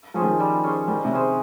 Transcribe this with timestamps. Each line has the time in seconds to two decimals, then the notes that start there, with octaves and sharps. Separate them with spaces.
0.14 F3 C#4 G#4 C5
0.22 D#3
0.29 F3
0.40 G3
0.64 C#4 G#4 C5
0.88 D#3 G3
1.05 C3
1.12 C#4 G#4 C5